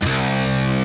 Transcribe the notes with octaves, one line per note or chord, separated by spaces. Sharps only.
C2 G2